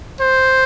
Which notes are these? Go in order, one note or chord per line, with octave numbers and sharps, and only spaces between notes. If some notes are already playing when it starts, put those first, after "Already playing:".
C5